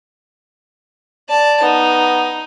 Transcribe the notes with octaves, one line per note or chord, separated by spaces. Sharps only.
D5 A5
B3 D#4